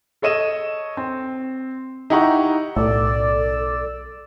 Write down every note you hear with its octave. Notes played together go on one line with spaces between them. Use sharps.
A4 C#5 D#5 D#7 E7
C4
D#4 E4 G4 F#5 A#5 C#6
B1 A2 A4 D5 E6